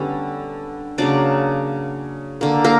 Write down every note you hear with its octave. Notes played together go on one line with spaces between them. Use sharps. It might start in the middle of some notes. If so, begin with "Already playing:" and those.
Already playing: D3 G3 B3 C#4
C#3 F#3 A#3 D4 D5
D3 A#3
A#3 A#4